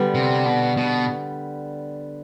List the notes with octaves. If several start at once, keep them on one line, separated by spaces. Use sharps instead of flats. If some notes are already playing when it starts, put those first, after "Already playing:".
Already playing: D3 G3 B3
C3
B2
B2